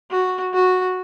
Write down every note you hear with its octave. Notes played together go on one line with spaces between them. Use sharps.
F#4
F#4